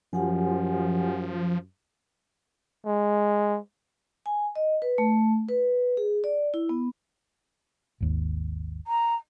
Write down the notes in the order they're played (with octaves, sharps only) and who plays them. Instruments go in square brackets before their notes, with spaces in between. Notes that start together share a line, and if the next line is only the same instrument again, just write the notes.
[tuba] F#2 [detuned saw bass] F3 [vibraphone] G4 F#5 G#5
[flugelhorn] G#3
[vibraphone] G#5
D#5
B4
A3
B4
G#4
D5
E4
B3
[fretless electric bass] G#1 D#2
[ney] A#5